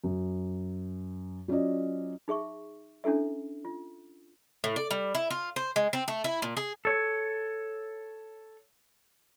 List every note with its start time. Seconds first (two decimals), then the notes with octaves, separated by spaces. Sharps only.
0.04 F#2
1.48 F#3 C#4 F4 D5 D#5
2.28 D#4 G#4 E5 C#6
3.04 C#4 D4 E4 A4 E5
3.65 F4
4.64 A2
4.76 D5
4.91 G3
5.15 E4
5.30 F4
5.56 C5
5.76 G#3
5.93 C4
6.08 A3
6.24 E4
6.42 A#2
6.57 G#4
6.85 A4 C#5